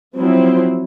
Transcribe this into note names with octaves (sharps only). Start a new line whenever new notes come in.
F3 F#3 C4 E4